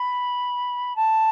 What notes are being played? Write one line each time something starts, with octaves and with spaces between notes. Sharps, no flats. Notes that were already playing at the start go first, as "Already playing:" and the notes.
Already playing: B5
A5